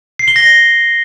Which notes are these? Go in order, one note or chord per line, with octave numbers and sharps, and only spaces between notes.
C7
G7
A#6